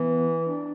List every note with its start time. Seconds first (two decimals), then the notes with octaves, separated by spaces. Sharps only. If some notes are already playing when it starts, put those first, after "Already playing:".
Already playing: E3 B3
0.46 D4